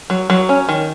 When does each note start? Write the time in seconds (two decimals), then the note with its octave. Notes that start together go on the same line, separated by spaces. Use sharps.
0.10 F#3
0.30 F#3
0.49 C#4
0.69 D#3